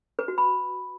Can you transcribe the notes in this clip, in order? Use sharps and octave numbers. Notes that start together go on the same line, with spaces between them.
B4
F#4
B5